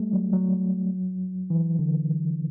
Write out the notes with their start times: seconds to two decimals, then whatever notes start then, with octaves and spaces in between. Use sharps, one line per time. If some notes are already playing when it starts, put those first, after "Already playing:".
Already playing: G3 A3
0.13 F#3
0.33 F#3
1.50 E3
1.79 D3